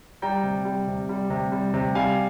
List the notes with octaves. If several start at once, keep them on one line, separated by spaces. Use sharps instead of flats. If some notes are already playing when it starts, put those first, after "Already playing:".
G3 G5 A#5
C3
G3
C3
G3
C3
G3
C3
G3 F5 G#5